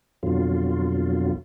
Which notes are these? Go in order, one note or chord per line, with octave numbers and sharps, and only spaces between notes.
F2 B2 D3 F#3 F4